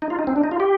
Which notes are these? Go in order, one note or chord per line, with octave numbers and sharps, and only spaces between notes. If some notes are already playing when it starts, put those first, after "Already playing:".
D#4
F4
D#4
C4
D4
D#4
F4
G4